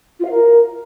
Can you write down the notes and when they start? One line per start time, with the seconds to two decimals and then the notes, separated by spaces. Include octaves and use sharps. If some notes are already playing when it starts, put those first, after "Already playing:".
0.19 F4
0.25 F5
0.31 A#4